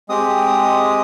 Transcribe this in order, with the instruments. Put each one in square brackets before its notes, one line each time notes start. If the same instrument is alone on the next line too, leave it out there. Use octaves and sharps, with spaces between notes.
[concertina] G#3 C4 G4 D#6